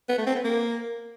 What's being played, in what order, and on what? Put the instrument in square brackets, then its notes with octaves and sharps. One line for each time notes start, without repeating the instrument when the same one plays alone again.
[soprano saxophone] B3
A3
C4
B3
A#3